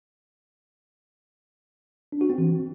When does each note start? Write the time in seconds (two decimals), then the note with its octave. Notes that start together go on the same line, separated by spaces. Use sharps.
2.12 D4
2.21 F#4
2.30 C4
2.38 E3